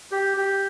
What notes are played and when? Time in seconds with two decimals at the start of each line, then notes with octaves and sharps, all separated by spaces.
0.12 G4
0.37 G4